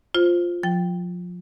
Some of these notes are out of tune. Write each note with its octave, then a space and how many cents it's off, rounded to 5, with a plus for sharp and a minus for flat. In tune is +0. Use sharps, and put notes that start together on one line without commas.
F4 +0 C5 +0
F3 +30 G5 +0